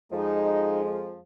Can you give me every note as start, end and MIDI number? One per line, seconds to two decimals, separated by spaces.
0.12 1.17 41
0.12 1.17 53
0.12 1.20 56
0.12 0.81 63